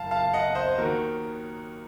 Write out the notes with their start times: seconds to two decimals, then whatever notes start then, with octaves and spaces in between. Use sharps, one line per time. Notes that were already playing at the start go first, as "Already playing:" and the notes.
Already playing: F#1 F#2 D#3 F5 A5
0.11 F5 A5
0.33 D#5 F#5
0.55 C5 D#5
0.78 D#2 D#3 F#4 A#4